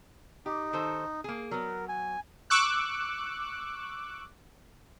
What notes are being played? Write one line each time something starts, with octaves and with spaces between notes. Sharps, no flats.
D#4 G4
D#3 A4 C5
A#3 G#4
F#3 B3 A#4
G#5
C#6 D6 E6 F#6